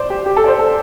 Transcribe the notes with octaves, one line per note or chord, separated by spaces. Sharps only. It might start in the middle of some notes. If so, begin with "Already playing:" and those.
Already playing: C5 D5
G4
G4
A4
D5
C5
A4